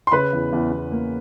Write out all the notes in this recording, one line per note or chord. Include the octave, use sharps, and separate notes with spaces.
C6
C#3 B4 B5
E2
E2
E2
A#3